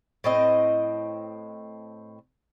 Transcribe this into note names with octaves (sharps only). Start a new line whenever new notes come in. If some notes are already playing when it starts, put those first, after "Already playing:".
A2 C4 D#5